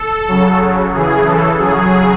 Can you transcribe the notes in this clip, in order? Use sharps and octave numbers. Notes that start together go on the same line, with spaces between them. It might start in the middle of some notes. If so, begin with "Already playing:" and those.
Already playing: A4
C#3 F#3
C#3 E3 G#4
A4
C#3 F#3 G#4